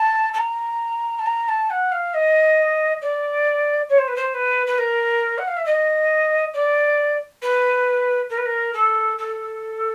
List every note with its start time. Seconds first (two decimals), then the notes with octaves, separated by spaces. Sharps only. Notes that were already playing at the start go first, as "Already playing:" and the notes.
Already playing: A5
0.33 A5
0.38 A#5
1.19 A5
1.26 A#5
1.48 A5
1.70 F#5
1.91 F5
2.14 D#5
3.01 D5
3.89 C#5
3.98 C5
4.07 B4
4.16 C5
4.34 B4
4.66 B4
4.78 A#4
5.38 F#5
5.47 F5
5.56 E5
5.65 D#5
6.54 D5
7.42 B4
8.29 A#4
8.37 B4
8.45 A#4
8.73 A4
9.18 A4